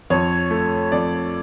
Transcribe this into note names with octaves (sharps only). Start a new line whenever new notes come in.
F2 C#5
A3
F2 D5